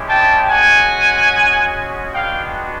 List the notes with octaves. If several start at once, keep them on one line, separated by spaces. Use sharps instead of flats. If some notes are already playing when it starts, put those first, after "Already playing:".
Already playing: G#3 C#4 E4 G4
G5 A5
G#3 C#4 F#4 F#5 G#5
G#3 B3 D4 F#4 F5 G5